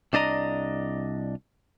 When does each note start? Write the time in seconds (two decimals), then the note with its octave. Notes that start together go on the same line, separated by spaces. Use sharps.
0.13 C2 D4 D5 D#5 A#5